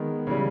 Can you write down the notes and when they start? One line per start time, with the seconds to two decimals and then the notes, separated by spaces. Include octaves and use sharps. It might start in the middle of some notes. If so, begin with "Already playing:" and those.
Already playing: D#3 G#3 B3
0.27 C#3 E3 G3